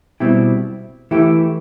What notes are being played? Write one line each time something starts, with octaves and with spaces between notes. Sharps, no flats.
B2 G3 C4 E4 G4
E3 A3 E4 G4